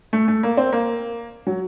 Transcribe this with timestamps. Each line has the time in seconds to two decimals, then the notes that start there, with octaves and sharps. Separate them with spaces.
0.13 A3
0.28 A3
0.43 A#3
0.57 C4
0.72 A#3
1.47 F#3